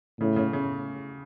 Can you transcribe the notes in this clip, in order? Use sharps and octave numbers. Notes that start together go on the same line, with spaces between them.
A2 C#3
C#3
C#3